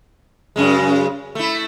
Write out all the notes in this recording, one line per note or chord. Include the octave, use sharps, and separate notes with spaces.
F#2 C#3 G#3
A3 E4